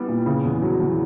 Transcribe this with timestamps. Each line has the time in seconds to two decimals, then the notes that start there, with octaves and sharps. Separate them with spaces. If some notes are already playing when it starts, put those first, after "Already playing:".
Already playing: G3 B3 E4
0.08 A#2
0.26 C#3
0.45 E2
0.62 F#3
0.80 E2